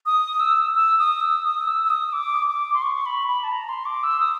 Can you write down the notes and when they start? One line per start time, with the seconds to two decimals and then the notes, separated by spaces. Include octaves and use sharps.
0.06 D#6
0.40 E6
0.74 E6
0.99 D#6
1.20 E6
1.44 D#6
1.67 E6
1.84 E6
1.90 D#6
2.13 D6
2.48 D6
2.74 C6
2.82 C#6
3.06 B5
3.28 B5
3.44 A5
3.52 A#5
3.69 C6
3.86 D6
4.03 E6
4.20 D#6